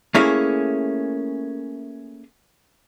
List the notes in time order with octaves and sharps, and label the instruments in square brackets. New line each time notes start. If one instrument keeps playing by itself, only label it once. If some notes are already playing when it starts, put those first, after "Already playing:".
[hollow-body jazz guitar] A3 A#3 C#4 E4 G#4